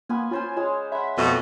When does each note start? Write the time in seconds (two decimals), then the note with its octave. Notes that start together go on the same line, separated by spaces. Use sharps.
0.09 A#3 B3 F4 G#5
0.31 C#4 F4 C5 G#5
0.57 G#3 C#5
0.92 E5 F#5 B5
1.18 F2 B2 A3